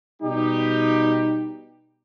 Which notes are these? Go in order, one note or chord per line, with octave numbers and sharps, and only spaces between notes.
B2 G3 D#4 G4